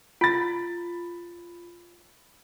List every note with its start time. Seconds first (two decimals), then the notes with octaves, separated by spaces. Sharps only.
0.21 F4 B5 A6